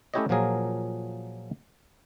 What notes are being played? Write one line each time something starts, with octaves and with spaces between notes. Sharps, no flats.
A3 C#4 E4 G4 C#5 D#5
A#2 F3 F#3 A#3 G#4 A#4